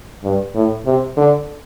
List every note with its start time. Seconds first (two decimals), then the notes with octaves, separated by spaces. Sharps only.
0.24 G2
0.55 A2
0.86 C3
1.17 D3